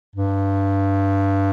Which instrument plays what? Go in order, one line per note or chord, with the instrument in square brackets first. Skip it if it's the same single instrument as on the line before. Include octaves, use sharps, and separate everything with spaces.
[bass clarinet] G2